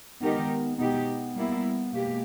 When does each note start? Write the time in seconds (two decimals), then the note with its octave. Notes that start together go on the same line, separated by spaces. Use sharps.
0.20 D#3 G#3 B3 D#4 G4 A#4
0.78 B2 G#3 B3 D#4 G4
1.35 G3 A#3 E4
1.93 B2 G#3 A#3 G4